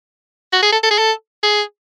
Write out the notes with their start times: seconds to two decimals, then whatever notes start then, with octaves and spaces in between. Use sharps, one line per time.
0.53 F#4
0.62 G#4
0.72 A4
0.83 A4
0.91 G#4
0.98 A4
1.43 G#4